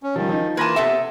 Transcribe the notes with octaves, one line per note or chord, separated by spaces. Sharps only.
C#4
D#3 F3 G3
F3 D#4
E3 A#3 F4 B4 A5 G#6 A#6 D#7
C3 B3 A4 E5